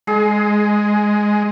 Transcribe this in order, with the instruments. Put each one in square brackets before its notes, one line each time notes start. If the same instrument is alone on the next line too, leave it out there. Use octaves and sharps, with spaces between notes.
[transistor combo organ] G#3 [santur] G#4